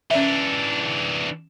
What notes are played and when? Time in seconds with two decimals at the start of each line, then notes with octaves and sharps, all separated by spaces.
0.11 E3 C#4 D4 D5 E5